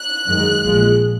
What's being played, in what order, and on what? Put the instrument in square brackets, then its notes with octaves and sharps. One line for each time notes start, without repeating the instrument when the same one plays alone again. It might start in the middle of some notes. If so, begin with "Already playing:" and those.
Already playing: [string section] F#6
F#2 D#3 G#3
A#1 A#2 F3 G#3